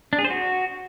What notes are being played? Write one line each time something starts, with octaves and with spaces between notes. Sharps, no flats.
D4
G#4
C5
F#4